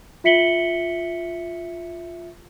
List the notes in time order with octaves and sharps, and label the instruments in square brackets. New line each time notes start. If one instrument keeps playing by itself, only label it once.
[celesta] F4 E5 B6 C#7 F#7 G7